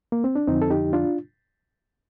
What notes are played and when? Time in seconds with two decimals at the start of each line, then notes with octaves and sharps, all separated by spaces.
0.12 A#3
0.24 C4
0.36 D4
0.47 F2 D3 F3 C4 D#4
0.62 A4
0.70 D#4 G4
0.93 D4 F4